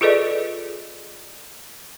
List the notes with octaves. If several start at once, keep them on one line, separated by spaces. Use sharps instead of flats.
F4 G#4 A4 B4 D5 D#5